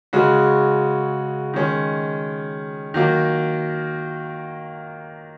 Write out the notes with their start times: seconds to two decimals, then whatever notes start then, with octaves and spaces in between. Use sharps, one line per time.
0.13 C#3 G#3 F#4
1.53 D#3 G#3 C#4
2.94 D#3 F#3 A#3